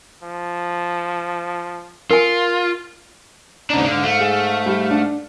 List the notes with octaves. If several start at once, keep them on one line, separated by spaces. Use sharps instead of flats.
F3
F4 A#4 G#5
D#2 G#2 C#3 D4 D#4
G#2 D3 F5
A3
G#4
G3
D4